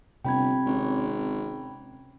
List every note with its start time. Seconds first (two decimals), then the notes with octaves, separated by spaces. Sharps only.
0.25 G1 C3 G5 B5 G#6
0.66 G#1 C#4